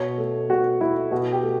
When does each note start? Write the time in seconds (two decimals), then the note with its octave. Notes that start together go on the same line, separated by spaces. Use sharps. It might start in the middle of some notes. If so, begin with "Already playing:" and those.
Already playing: B2 C#5
0.18 A3
0.49 B2 F#4
0.80 A3 E4
1.11 B2 F#4
1.32 G4
1.43 A3